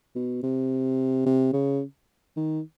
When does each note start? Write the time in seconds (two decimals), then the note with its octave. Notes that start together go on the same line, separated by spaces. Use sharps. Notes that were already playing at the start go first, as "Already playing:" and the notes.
0.15 B2
0.43 C3
1.26 C3
1.53 C#3
2.37 D#3